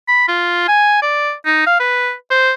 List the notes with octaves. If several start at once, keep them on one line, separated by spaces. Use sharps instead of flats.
B5
F4
G#5
D5
D#4
F5
B4
C5